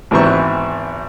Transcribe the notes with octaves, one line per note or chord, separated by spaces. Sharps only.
G#1 G#2 E3 B3 C4 C#6